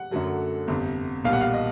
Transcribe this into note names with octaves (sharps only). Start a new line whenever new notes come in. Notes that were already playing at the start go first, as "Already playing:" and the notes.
Already playing: F#5
F#2 D3 F#3 A3
G1 F2 C3
B1 A#2 G3 F5
F#5
F5
D#5